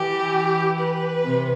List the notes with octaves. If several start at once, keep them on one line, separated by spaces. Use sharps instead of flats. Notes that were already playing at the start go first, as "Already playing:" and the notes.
Already playing: E3 G4
B4
C3